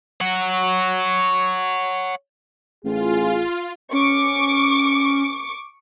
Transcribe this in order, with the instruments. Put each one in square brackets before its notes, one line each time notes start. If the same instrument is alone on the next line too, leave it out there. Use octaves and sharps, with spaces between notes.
[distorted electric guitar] C#5 F#5
[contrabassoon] A1 [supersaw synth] F4 [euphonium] G#4
[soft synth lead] C#4 [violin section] C#6 D6